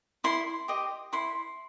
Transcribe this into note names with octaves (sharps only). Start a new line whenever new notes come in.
E4 C6
G4 D#5
E4 C6